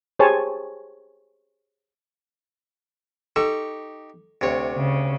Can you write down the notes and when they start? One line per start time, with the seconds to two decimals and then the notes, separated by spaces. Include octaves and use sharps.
0.19 G4 G#4 C5 C#5 G#5 A5
3.36 D#4 G4 A4 C#6
4.41 D2 C3 C#5
4.75 C#3